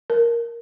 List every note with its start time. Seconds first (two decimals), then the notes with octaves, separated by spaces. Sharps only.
0.10 A#4